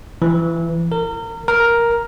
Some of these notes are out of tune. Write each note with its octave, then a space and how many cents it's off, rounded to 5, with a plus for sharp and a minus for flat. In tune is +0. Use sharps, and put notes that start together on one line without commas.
E3 +25
A#4 -30
A#4 +5